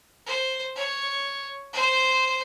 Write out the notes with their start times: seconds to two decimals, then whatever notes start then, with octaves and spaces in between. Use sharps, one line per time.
0.26 C5
0.76 C#5
1.73 C5